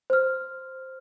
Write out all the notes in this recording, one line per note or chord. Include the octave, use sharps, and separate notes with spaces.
C5 F6